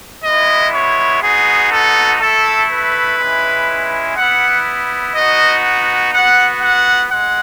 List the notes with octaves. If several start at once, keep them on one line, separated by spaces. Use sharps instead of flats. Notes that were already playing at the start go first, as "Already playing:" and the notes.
G#3 B3 E4 D#5
C#5
B3 D#4 F#4 G#4
A4
A3 E4 A4
B4
G#3 C#4 E4
B3 E4 F#5
B3 D#4 F#4 D#5
B3 F#4 F#5
F#5
G#3 F#5